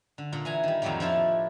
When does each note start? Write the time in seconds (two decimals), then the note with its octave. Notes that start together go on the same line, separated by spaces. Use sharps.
0.18 D3
0.33 A#2 D4
0.45 E3 G#5 A#5
0.63 D#3 G3
0.82 F2 A2 D#3 F#3 G3 A#3
1.00 F3 D4 E4 F4